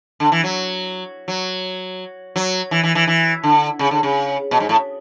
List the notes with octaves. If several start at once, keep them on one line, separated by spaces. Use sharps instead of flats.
D3
E3
F#3
F#3
F#3
E3
E3
E3
E3
D3
C#3
D3
C#3
B2
G#2
A2